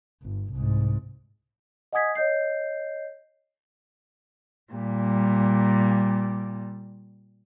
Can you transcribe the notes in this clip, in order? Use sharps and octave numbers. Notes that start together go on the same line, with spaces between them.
G1
C2 G#2
D#5 F#5 G#5 D#6 G#6 B6
C#5 D#5 G6 C7
A#2 G3